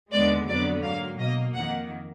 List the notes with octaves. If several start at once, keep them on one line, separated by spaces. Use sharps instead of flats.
D#2 D3 G#3 B3 D5
F2 D3 F#3 B3 D5
G#2 F#3 A#3 F5
B2 A#3 D#5
F2 D#3 A#3 F#5